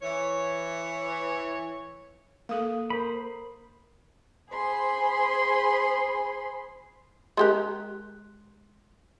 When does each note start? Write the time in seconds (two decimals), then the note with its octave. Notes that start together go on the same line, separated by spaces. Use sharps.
0.02 E3 C#5
2.49 A#3 A4 F5 D#6
2.90 A#4 C5 B5
4.52 G#4 C5 B5 C6
7.37 G#3 G4 A#4 C6 F#6